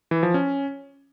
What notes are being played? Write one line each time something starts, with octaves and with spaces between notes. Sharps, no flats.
E3
F3
C#4